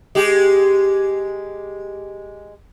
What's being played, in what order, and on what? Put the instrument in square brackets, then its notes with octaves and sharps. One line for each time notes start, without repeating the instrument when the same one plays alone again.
[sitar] G#3 G4